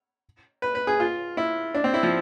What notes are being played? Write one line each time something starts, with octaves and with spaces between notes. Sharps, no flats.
B4
B4
G#4
F4
E4
D4
C4
E4
F3